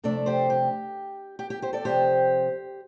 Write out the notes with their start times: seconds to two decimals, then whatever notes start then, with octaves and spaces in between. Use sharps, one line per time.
0.04 F2 C3 A3 D4 A4 D5
0.26 G4 C5
0.50 G4
1.39 G4
1.50 G4
1.62 G4 C5
1.73 A4 D5
1.84 F2 C3 F3 G4 C5